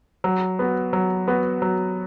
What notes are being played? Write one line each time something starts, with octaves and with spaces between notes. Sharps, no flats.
F#3
B3 F#4
F#3
B3 F#4
F#3